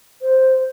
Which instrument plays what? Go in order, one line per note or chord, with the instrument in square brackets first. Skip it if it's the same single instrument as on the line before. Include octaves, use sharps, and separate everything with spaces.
[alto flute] C5